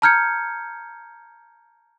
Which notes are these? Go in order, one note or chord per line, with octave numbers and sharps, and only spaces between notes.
A5 A#5 F6 G6 G#6 C#7